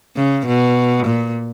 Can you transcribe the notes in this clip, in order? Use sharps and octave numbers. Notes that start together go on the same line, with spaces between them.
C#3
B2
A#2